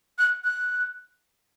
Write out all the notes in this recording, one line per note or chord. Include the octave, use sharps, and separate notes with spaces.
F#6
F#6